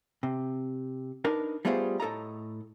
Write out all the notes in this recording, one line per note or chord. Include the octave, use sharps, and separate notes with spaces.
C3
D4 D#4 A#4 B4
G3 A3 B3 F4 G#4 C5
A2 A4 D#5 A#5